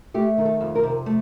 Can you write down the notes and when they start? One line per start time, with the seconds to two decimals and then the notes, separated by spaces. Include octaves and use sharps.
0.14 A3 G4
0.38 D#3
0.45 A4
0.61 F2
0.75 A#4
0.83 C3
1.06 A3